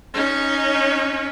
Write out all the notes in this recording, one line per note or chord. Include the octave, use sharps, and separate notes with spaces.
C#4 D#4